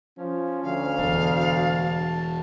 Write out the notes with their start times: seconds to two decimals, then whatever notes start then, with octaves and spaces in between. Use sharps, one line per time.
0.18 F3 C#4
0.63 D2 F5
0.99 E1 E2 A4
1.43 A5